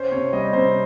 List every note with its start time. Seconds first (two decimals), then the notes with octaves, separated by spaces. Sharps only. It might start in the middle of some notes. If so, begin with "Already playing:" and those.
Already playing: C#4 C5
0.12 C3 C#5
0.33 G3 D#5
0.53 C3 C5